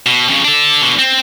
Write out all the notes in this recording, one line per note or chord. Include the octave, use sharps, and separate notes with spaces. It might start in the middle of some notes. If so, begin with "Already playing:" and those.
B2
F2 C#3
D4 A4
B2 D3
C4